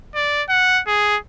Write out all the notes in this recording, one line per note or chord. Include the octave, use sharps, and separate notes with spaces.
D5
F#5
G#4